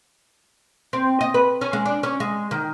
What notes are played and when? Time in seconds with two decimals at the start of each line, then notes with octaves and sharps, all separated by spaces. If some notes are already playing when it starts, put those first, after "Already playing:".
0.93 C4
1.21 D#5
1.34 B4
1.61 C#4
1.73 G#3
1.85 D4
2.03 C#4
2.20 G#3
2.51 D#3